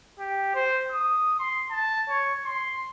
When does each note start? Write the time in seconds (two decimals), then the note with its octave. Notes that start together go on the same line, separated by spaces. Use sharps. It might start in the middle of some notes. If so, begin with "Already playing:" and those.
0.19 G4
0.55 C5
0.91 D#6
1.39 C6
1.71 A5
2.09 C#5
2.45 C6